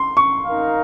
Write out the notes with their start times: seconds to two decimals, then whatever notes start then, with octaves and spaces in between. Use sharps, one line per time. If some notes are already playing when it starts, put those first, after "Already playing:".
Already playing: C6
0.17 C#6
0.45 D#4 A#4 F5